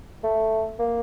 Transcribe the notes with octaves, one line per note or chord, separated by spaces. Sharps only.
A3
A#3